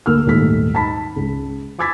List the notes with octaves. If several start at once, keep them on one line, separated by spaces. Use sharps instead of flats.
D2 A#3 A#4 E6 F6
D#1 D#2 G#2 A3 B6
D#4 A5 B5 B6
C#2
G#5 D6 E6 G#6 A6 B6